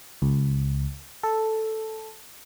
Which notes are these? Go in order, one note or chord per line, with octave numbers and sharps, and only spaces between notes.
C#2
A4